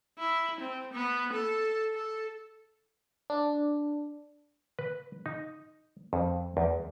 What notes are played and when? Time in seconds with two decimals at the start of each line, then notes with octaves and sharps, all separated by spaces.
0.18 E4
0.60 C4
0.93 B3
1.33 A4
1.94 A4
3.30 D4
4.79 B4
5.26 D#4
6.13 F2
6.57 E2